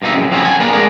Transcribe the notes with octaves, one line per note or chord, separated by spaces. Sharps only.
G2 B2 A#3 D#4 E5
F#2 A2 C#3
F3 F#3 C4 C#4 D#4 E4
A4 F#5 G#5
A#3 B3 D4 G#4 A#4 B4
G#3 A3 B3 D4 A#4 D5